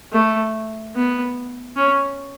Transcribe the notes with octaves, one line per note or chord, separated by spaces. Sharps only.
A3
B3
C#4